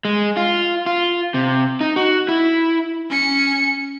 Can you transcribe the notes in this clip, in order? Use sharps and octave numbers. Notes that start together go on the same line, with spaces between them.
G#3
F4
F4
C3
D#4
F#4
E4
C#4 C#7